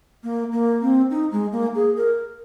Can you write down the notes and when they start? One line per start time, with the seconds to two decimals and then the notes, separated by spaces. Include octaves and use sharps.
0.24 A#3
0.52 A#3
0.82 C4
1.10 D#4
1.32 G#3
1.52 A#3
1.75 G#4
1.97 A#4